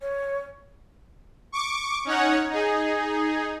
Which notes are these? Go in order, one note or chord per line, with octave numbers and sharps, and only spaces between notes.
C#5
C#6 D6
C#4 D#4 C#5 F#5
D#4 G#4